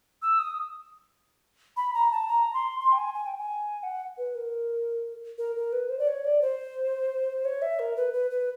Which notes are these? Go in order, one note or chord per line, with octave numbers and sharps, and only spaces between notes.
E6
D#6
B5
A#5
A5
A#5
C6
C6
G5
G#5
G#5
G5
G#5
F#5
B4
A#4
A#4
A#4
B4
C5
D5
C#5
D5
C5
C#5
E5
A#4
B4
B4
B4